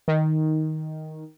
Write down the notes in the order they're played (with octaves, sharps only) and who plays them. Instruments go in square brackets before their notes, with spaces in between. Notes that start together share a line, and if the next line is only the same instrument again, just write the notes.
[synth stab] D#3